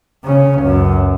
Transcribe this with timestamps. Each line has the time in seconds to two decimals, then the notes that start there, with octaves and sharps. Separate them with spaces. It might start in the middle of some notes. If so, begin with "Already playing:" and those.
0.24 C#3 C#4
0.59 C#2 F#2